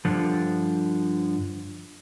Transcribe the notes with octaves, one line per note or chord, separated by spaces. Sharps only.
G2 D3 F3